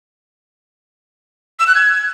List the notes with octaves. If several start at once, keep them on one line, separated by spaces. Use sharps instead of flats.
E6
F#6
G#6